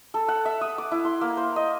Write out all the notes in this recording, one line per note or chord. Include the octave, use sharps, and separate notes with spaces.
A4
F#5
E5
D#6
D6
E4
C6
A#3
C5
D#5